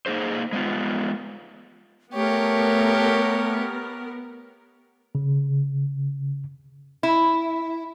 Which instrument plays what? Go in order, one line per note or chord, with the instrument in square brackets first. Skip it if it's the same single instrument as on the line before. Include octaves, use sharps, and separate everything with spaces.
[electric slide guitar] A#3 D#4 G#4 C5
G#3 B3 F4
[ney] A3 [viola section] B3 A#4 [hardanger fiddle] G4 C#5
[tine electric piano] C#3
[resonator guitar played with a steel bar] E4